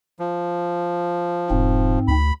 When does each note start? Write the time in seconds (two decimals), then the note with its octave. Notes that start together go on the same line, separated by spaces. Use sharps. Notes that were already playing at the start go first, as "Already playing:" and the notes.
0.19 F3
1.50 E1 G#2 C4
2.08 D2 B5